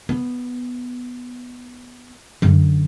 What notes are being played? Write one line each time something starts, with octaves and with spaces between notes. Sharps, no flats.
B3
F#2 D3